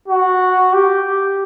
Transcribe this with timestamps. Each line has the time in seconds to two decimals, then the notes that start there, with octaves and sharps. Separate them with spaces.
0.08 F#4
0.74 G4